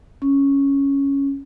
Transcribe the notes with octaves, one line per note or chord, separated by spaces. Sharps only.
C#4